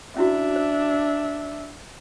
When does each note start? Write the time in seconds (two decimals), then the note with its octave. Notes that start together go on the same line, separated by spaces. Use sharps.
0.16 C#4 D4 E4 F#4 E5
0.56 C5